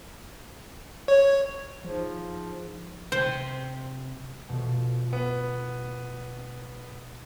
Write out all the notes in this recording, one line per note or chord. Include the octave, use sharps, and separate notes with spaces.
C#5
F3 D#4 G#4 C5
C3 C5 G5
B2 F3 A3
B3